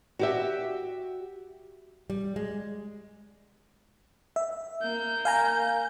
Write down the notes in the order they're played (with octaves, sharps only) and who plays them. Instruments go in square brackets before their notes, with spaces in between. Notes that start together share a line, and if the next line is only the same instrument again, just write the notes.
[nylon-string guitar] F#4 G4 E5
G3
G#3
[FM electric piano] E5
[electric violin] A#3 G6
[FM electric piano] F5 G#5 A#5